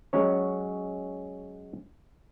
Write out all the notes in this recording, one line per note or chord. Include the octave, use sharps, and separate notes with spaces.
F#3 G#3 C#4 C#5